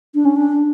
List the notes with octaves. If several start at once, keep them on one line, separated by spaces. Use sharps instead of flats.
D4
C#4
D4